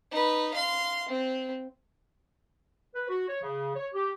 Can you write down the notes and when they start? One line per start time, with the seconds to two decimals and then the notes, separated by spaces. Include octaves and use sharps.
0.12 D#4 B4
0.54 F5 C6
1.09 C4
2.95 B4
3.09 F#4
3.29 C#5
3.42 C#3
3.76 C#5
3.94 G4